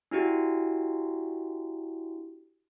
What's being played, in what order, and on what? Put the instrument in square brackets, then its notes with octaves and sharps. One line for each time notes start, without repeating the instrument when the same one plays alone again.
[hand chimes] D4 E4 F#4 G4